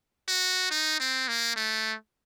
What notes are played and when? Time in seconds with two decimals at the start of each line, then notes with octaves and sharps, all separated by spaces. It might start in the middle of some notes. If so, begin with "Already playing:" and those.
0.28 F#4
0.71 D#4
1.00 C4
1.28 A#3
1.56 A3